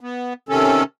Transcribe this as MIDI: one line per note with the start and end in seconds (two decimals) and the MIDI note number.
0.01 0.33 59
0.49 0.83 48
0.49 0.83 51
0.49 0.83 61
0.49 0.83 69